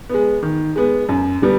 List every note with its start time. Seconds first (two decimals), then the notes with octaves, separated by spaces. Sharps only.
0.09 G#3 B3
0.43 D#3
0.76 G#3 B3
1.09 F#2
1.42 D3 G3 B3